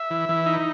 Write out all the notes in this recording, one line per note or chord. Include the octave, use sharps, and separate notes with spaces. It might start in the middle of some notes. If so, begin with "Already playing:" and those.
Already playing: E5
E3
E3
D#4